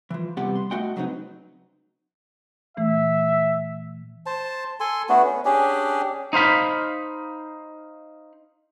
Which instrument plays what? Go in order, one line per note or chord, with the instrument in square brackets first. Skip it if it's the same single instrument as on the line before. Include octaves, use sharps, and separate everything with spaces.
[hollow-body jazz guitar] E3 F3
C3 G3 B3 G4 F#5
C6
A3 E4 F#4 D#5 F#5 G5
C#3 F#3 B3 C4 D4 D#4
[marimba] A#2 E3 A3 [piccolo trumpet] E5
[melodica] C5 A5
A4 G#5 C6
A3 B3 D4 F#4
C#4
C#4 D4 G4 G#4
[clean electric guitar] D#4 C5 F5 B5